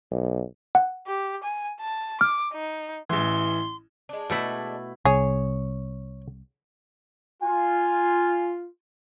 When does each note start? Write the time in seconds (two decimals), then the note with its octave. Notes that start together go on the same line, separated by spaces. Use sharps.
0.11 B1
0.75 F#5
1.07 G4
1.44 G#5
1.80 A5
2.21 D6 F6
2.53 D#4
3.09 A1 E3 C6
4.09 G#3 D4
4.30 B2 A3 E4
5.05 C2 G#4 C#5
7.43 F4 G#5